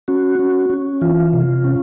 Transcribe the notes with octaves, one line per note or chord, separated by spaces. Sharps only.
C#4 F#4
C#4
C#4
E3 F4
C3
C#4